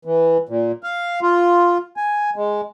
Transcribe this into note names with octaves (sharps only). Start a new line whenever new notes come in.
E3
A#2
F5
F4
G#5
G#3